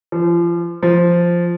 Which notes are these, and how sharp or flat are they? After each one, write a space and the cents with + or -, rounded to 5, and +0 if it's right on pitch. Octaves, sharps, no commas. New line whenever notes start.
F3 -35
F3 -5